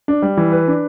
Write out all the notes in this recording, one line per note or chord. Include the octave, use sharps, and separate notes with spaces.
D4
G3
E3
B4
D4